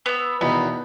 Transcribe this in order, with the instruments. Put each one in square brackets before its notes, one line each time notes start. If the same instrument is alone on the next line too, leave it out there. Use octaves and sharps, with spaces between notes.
[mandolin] B3 E6
[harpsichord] E2 B2 D#3 [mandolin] B3